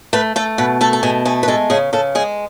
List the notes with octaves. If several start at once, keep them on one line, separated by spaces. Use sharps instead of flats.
A3 B4
A3 A4
B2 B4
A3 A4
A4
B2 G#4
A3 G#4
B4
G#3 A4
C#3 G#4
C#3 A4
G#3 G#4